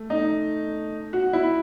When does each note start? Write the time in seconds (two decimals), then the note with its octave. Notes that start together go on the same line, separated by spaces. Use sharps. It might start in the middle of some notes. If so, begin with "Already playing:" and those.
Already playing: A3
0.10 D#4
1.13 F#4
1.33 E4